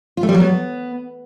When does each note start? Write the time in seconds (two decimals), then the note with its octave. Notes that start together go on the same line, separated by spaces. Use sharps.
0.17 F4
0.23 A3
0.29 G3
0.34 F#3
0.40 B3